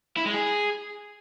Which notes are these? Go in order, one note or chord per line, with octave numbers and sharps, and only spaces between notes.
E4
G#3
G#4